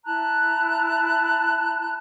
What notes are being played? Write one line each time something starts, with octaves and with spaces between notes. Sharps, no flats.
E4 A5 A#5 F#6